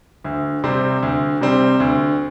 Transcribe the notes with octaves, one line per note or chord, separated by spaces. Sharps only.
D2
C3 G3 C4
D2
C3 G3 C4
D2